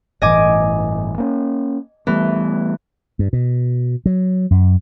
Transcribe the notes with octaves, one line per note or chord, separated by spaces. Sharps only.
G1 A2 E3 D#5 G#5 D6
A#3 C4 C#4
E3 G3 A3 B3
G2
B2
F#3
F#2